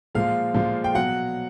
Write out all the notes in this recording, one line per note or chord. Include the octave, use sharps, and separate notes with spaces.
A#2 F3 G#3 F5
A#2 F3 G#3
G5
B2 F#3 F#5